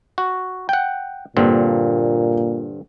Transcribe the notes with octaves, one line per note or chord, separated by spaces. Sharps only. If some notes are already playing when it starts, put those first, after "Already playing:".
F#4
F#5 G5
G2 A#2 D3 A#3 C4